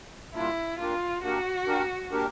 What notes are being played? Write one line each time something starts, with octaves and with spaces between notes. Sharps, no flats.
A#2 G3 A#3 D4 E4 F4
A#3 D4 F4 G4 A#4
A#3 D4 F#4 G4 A#4
A#3 D4 G4 A#4
A#3 D4 G4 A#4